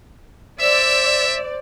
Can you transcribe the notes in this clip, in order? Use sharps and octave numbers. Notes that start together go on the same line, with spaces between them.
C5 D5 E5 E6